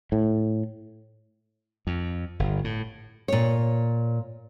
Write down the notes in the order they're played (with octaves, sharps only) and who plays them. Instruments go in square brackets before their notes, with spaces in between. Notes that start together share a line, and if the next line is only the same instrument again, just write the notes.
[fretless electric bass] A2
[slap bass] F2
G1
A2
[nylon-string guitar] A#2 C#5